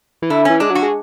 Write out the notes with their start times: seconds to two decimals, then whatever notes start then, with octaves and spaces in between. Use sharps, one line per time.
0.22 E3
0.30 D3 E4
0.45 E3 C#4
0.60 G#3 D4
0.70 F#3
0.75 F#4
0.83 G#3